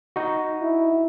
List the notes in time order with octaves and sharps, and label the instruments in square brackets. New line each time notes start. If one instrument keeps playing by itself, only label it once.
[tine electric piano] D#4 F#4
[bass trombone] E4